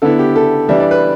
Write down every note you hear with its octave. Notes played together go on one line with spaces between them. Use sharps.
D3 B3 E4 A4
G4
A4
E3 G3 D4 E5
D5
B4